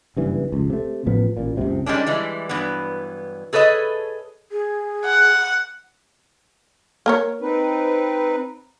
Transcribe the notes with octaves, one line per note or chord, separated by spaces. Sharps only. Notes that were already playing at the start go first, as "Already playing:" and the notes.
F#1 G2 E3
F1 C#2
C3 A3
A1 A2 F3 B3
A1 A#2
F#1 C#2 C3
D#3 G3 G#3 C#4 D4
E3 G3 G#3
G2 E3 F#3 B3
G#4 A4 B4 C#5 D#5
G#4
F#5
A#3 A#4 C#5
C4 D#4 B4